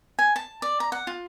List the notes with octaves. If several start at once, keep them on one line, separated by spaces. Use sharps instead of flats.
G#5
A5
D5
A#5
F#5
F4